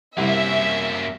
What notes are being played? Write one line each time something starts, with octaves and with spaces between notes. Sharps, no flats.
C2 F#2 A#3 E5 F#5